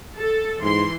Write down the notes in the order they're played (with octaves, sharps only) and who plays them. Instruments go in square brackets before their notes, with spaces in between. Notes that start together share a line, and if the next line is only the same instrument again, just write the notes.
[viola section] A4
[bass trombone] G#2 [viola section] E3 C6